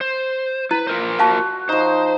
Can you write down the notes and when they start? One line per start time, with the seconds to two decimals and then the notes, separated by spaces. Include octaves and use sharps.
0.01 C5
0.71 E4 B4
0.87 F4 A#4 C5
1.19 F#4 F5 A5
1.69 F3 D#4 C5